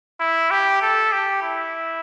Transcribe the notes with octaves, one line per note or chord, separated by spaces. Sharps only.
E4
G4
A4
G4
E4